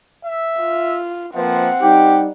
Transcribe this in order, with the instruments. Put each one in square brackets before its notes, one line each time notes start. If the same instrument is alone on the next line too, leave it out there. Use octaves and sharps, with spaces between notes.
[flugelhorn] E5
[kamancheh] F4
[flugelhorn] F3 [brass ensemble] A#3 B4 E5 [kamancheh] C4 F#5
[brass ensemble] G3 D#4 [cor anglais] G4 [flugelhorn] G5